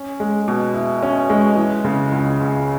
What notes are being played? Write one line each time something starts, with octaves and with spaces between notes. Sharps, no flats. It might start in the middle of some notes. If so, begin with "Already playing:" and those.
Already playing: C#4
G#3
B2
E4
C#4
G#3
E3
C#3
C#2
C#2